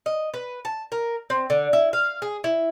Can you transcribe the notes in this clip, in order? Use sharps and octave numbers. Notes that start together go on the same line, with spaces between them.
D#5
B4
A5
A#4
C4
D3
E4
F5
G#4
E4